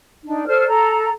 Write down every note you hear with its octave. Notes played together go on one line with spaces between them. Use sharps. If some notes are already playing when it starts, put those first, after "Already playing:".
D4 D#4
A4 C5 D5 F6
A4 A#5